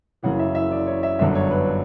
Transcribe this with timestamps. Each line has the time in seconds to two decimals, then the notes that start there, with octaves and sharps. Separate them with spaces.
0.23 F#1 F#2 C#3 E3 F#5
0.39 E5
0.55 E5
0.71 D5
0.86 C#5
1.03 E5
1.19 G1 F#2 D3 E5
1.35 C#5
1.51 B4